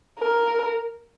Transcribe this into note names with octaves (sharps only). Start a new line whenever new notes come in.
A#4